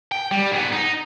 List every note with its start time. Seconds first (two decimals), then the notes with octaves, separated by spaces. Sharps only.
0.12 G5
0.31 G3
0.52 G#2 B3
0.73 D#4